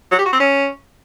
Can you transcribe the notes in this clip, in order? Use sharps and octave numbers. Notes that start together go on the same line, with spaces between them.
F#3
G4
F#4
C4
C#4